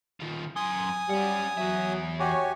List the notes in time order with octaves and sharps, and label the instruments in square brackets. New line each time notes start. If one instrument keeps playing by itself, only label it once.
[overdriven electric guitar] D#3 F4
[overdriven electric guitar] F#2 C6 [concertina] G#5 D#6
[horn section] G3 [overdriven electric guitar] C#4 F#5
[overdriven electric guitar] E2 E5 [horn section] F#3
[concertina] F#4 G4 G#5 [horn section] C#5